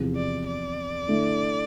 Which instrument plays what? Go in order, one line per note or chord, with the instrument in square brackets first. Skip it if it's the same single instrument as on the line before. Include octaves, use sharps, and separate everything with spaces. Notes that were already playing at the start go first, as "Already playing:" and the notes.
Already playing: [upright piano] E2 C3 F3
[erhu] D5
D5
[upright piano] D3 A3 E4